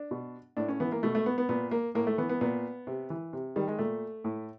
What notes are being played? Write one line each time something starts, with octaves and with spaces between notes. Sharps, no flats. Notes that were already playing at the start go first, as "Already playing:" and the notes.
Already playing: D4
B2
A2 D4
C#4
E3 B3
A#3
B2 A3
A3
B3
B3
A#2 B3
A#3
A2 A#3
A3
E3 B3
B3
A#2 B3
C3
E3
C3
D#3 G3
G#3
A#2 A3
A2